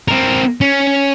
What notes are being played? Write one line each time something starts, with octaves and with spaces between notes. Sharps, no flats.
C4 A#4
C#4